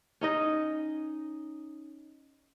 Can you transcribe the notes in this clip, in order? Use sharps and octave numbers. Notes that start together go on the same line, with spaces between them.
C#4 D#4 D#5